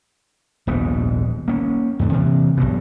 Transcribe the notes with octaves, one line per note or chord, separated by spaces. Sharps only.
D#1 A#1 G#2 B3
A#3 C#4
E2 G#2 D3
C3 E3 A#3
B1 G2 B2